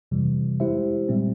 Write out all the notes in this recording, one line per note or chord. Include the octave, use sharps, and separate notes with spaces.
F2 C3 E3 G3
G#3 E4 G4 C5 E5
A#2 G3 C4